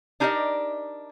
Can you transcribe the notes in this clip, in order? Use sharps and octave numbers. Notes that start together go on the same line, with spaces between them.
D4 D#4 G4 A#4 D5 D#5